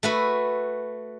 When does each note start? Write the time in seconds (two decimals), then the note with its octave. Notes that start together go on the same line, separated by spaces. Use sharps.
0.03 A3 F#4 B4